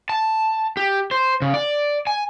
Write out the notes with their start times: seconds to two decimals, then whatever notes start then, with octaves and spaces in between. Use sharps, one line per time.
0.09 A5
0.77 G4
1.11 C5
1.42 C#3
1.54 D5
2.07 G#5